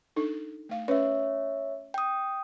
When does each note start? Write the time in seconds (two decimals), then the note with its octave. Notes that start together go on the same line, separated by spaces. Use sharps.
0.16 D4 D#4 A4
0.69 A3 F5
0.88 C#4 B4 C#5 E5
1.94 G5 D#6